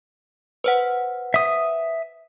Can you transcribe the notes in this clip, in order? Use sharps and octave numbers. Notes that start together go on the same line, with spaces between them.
B4 C5 F#5
E5 D#6